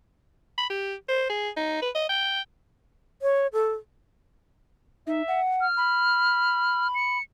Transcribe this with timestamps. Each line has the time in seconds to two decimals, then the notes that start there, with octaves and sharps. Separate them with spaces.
0.58 B5
0.70 G4
1.08 C5
1.29 G#4
1.57 D#4
1.82 B4
1.95 D#5
2.09 G5
3.22 C#5
3.53 A4
5.07 D#4 E5
5.28 F#5
5.61 F6
5.77 B5
6.95 C#7